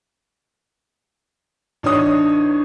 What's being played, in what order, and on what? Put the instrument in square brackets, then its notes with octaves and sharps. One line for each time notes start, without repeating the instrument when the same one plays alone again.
[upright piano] A1 D4 D#4 C#5 D#6